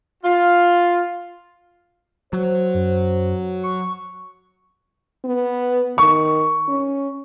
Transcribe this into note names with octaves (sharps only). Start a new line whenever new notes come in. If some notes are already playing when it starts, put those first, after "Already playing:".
F4
F#3 C5
F#2
C#6
B3
D#3 C#6
C#4